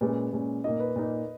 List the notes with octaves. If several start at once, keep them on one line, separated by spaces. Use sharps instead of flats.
A#2 G#3 C#4 B4
A#2 G#3 C#4
A#2 A#3 D#4 D#5
B4
A#2 A#3 D#4